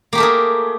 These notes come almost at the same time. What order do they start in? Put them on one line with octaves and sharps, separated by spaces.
A#3 G4 A3 A#4 G#4